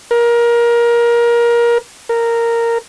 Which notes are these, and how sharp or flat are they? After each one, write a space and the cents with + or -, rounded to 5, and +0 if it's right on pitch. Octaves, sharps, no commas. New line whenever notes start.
A#4 +20
A#4 -10